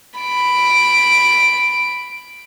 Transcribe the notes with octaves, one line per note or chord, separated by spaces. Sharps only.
B5 D7